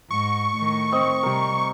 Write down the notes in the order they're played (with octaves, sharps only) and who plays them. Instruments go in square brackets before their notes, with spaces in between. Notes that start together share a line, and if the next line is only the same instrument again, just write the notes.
[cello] G#2 [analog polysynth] C#6
[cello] A2 D#3
[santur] C4 D#5
[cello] C3 G3 [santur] G4 A#4